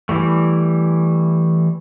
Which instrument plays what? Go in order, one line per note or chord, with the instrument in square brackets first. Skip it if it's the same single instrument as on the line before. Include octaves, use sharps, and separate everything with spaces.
[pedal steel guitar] E3 G3 A3